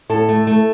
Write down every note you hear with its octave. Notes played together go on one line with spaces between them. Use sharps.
A2 A4
A3
A3